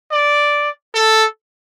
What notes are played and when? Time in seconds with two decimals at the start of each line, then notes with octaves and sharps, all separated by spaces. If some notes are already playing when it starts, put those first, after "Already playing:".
0.11 D5
0.95 A4